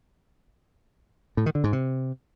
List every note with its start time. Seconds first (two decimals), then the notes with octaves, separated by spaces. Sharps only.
1.37 A2
1.46 D#3
1.55 D3
1.64 G#2
1.73 C3